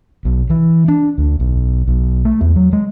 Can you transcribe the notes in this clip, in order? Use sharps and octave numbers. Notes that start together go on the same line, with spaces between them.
B1
E3
D4
D2
B1
B1
A3
E2
F#3
G#3